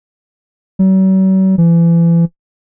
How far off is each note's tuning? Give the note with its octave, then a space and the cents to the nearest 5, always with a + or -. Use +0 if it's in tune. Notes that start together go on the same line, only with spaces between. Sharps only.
F#3 +45
E3 +35